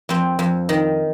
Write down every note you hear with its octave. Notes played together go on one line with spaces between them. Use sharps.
F2 C4
F2
D#3